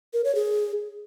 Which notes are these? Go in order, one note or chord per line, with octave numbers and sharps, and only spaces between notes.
A#4
C#5
G#4